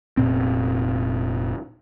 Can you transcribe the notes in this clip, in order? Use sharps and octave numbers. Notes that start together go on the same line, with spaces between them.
F1 A#2 C4